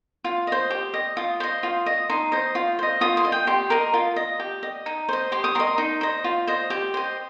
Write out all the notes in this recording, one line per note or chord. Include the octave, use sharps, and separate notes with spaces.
F4
C5 D#5
G4
D#5
F4 D#6
C5 D#5
F4
D#5
D#4 C6
C5 D#5
F4
C5 D#5
F4 D#6
C6
D#5
G5
G4 C6
A#4 D#5
F4
D#5
G4
D#5
D#4
C5 D#5
G4 C6
D#6
A#4 D#5 C6
D#4
C5 D#5
F4
C5 D#5
G4
C5 D#5